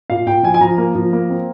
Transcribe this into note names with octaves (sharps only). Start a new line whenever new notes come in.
A#2 F5
A#2 G5
F3 G#5
G#5
F3 A#5
A#3
F3
A#3
C4